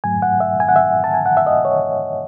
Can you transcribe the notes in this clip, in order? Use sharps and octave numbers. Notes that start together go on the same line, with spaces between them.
G#2 F#3 A3 G#5
F#5
E5
G#5
F#5
E5
A5
G#5
F#5
E5
D#5
C#5